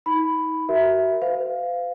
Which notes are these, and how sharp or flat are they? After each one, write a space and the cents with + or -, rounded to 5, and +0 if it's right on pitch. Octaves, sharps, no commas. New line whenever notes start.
D#4 +40 B5 +5
F#4 +25 A#4 +0 E5 +0
C5 -45 F5 +0